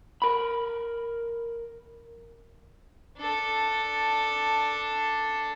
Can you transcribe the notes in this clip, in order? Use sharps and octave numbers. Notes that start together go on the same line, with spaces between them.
A#4 B5
D4 A4